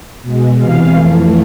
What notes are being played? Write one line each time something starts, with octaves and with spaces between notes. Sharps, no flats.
B2 G#3
E2 C3 E3 F5
F2 E3 A3